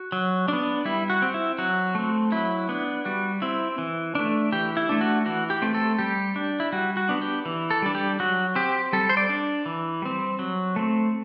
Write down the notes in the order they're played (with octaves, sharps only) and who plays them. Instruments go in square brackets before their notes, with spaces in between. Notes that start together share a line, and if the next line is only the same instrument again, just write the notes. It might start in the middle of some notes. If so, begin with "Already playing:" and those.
Already playing: [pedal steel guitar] F#4
F#3
B3 D4
G3 E4
F#4
C4
E4
F#3 F#4
A3 C4
F#3 E4
B3 D4
G3 F#4
C4 E4
E3
A3 D4
E3 G4
E4
A3 D4
F#4
E3 F#4
G4
A3 C4
A4
G3 G4
D4
E4
G3 F#4
F#4
B3 D4
G4
E3
A4
G3 D4
G4
F#3 F#4
C4 G4
G3 A4
C5
D5
D4
E3
G3 C4
F#3
A3 C4